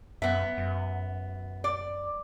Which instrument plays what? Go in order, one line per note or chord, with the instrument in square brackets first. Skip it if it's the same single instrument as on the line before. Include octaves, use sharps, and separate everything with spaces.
[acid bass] F#2 [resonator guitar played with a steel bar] B3 E5
[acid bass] F#2
[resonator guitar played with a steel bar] D5